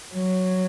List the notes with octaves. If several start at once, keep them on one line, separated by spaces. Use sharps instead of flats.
F#3